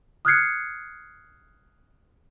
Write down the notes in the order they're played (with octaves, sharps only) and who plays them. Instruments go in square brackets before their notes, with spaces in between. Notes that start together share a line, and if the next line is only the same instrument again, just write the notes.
[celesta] D#6 F6 F#6 G#6 C7 C#7